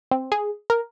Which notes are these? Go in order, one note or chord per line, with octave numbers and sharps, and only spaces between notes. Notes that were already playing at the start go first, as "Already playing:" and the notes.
C4
G#4
A#4